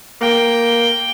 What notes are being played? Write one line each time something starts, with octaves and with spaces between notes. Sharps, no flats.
A#3 G5